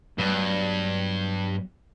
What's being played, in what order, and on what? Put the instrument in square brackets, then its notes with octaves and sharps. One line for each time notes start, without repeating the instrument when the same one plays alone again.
[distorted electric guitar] G2 [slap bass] F#3 A3 B3